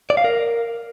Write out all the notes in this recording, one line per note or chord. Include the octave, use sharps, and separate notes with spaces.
D5
F5
A#4